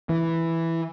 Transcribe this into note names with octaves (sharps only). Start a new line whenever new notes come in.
E3